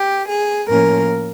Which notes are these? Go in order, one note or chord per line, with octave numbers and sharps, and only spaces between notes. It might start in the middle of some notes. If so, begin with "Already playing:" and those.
Already playing: G4
G#4
A2 F3 A#3 C#4 A#4